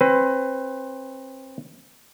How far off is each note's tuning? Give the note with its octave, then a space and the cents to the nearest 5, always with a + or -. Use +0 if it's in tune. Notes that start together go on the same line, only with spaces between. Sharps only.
C4 +30 B4 +25